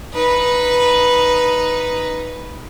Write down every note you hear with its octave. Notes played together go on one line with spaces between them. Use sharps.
D#4 B4